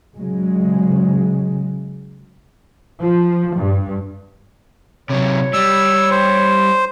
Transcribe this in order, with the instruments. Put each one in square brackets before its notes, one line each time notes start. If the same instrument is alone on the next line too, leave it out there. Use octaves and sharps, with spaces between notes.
[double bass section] C#3 F#3 G#3
F3
G2
[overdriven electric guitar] C3 F#3 [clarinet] C#5
[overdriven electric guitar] G3 [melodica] E6
[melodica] C5